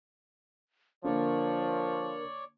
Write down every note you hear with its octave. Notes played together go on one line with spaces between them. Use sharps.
D3 F3 A#3 A#4 C#5 D5